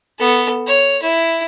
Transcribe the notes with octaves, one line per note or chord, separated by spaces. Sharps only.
B3 A4
C#5
E4